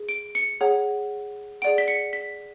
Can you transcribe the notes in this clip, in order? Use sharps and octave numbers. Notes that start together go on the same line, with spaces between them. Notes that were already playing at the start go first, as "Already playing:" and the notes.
Already playing: G#4
D7
C#7
G#4 C#5 F#5
G#4 D5 F#5 D7
B6
C#7
B6